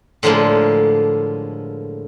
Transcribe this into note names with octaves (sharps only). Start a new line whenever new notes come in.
A2 D3 F3 G#3 A#3